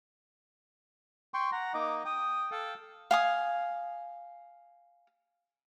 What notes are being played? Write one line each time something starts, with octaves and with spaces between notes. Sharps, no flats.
G5 C6 C#6
F#5 A#5
A#3 D#4 D#5 D6
G5 D#6
A4 F5 G5
F5 G#5 D#6